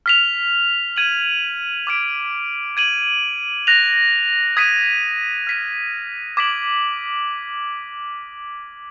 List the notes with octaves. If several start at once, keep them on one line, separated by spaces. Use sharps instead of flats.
F6 B6 F7
G#6 D#7 F#7
D6 F6 G#6 D7
G#6 D#7 F#7
F#6 A#6 F7
D#6 G#6 B6 D#7
F6 B6 D#7
D6 G#6 B6 D7 F#7